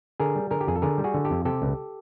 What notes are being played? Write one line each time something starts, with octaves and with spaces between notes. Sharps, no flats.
D3 G#4 A#4
G3
D3 G#4 A#4
G4
F2 G#4
A4
D3 G#4 A#4
G3
F#4 G#4
D3
G4 A4
F2
C3 G4 A4
C#2